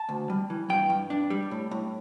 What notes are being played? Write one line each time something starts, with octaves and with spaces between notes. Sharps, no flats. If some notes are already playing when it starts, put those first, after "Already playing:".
Already playing: A5
D2
G3
E3
G2 G5
G2
D4
G3
A2
A2